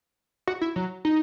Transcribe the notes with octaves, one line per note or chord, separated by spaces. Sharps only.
F#4
E4
F#3
D#4